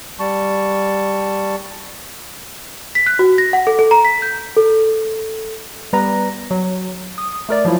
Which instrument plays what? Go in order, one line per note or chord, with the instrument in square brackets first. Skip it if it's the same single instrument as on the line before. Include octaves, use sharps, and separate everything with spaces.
[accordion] G3 A5 C#6
[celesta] B6
F#6
F#4
A#6
F#5
A4
A4
A#5
B6
G6
A4
[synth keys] G3 B3 B4 A#5 A#6
F#3
D#6
A3 A#4 D5
F3 F#3 E4 F4